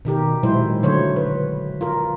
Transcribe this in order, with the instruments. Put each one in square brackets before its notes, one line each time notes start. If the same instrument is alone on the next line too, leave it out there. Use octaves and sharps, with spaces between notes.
[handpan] B2 D#3 G4 A#4
A#2 F#3 G#3 E4 C5
D3 F#3 A3 C5 C#5
B4
F4 A#4